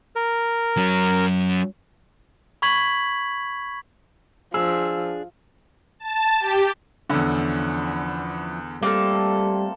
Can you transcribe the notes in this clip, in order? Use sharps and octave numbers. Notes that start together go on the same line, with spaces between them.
A#4
F#3 C#4
B5 C#6 G#6 B6 F#7
F3 D4 G#4 E6
A5
G4
E2 D3 F3 C#4 E4
G3 A3 A#3 C4 F4 A4